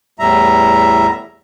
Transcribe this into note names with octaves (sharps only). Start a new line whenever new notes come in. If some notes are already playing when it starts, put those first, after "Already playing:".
E2 A2 G3 E5 A#5